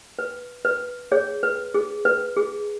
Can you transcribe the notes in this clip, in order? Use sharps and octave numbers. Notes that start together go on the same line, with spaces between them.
B4
B4
G#4 C#5
B4
G#4
B4
G#4